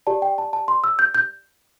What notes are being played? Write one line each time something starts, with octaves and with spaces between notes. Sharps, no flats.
G4 D5 A5
G5
A5
A5
C6
E6
G6
G6